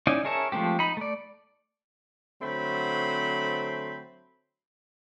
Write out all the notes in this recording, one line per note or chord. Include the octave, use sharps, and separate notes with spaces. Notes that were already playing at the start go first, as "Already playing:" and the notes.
C#4 D#4 E4 D5
G#4 A#4 C#5 E5 A5
F3 G#3 A3 C4 G4
D#4 B5
A3 D5
D3 F#3 A3 C4 C5 B5